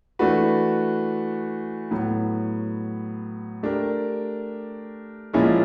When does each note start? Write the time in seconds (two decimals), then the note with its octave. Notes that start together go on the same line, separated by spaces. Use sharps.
0.19 E3 A3 D4 F#4 B4
1.91 A2 F#3 B3
3.63 A3 D4 G4 A#4
5.33 A#2 F3 G#3 C#4 E4